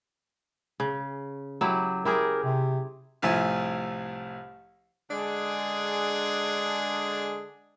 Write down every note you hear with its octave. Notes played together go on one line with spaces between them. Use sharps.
C#3
F#3 E4 G4
E4 G4 G#4 A#4
C3
C2 A2 F3 E5 G#5
D3 G#3 D4 G#4